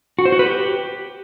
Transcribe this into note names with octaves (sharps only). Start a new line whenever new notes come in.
F#4
C5
F#4
B4
G4